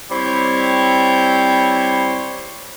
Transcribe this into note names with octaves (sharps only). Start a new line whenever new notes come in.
G3 C4 E4 C5 C#5